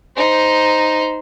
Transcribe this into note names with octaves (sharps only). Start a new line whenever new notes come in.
D#4 C5